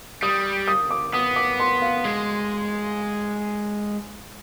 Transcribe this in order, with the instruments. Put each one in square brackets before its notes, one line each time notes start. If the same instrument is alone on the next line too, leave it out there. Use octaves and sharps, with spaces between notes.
[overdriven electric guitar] G3 [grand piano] D#6
[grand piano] D#6
D6
[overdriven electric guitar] B3 [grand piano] D#6
[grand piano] D6
C6
F5
[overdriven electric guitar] G#3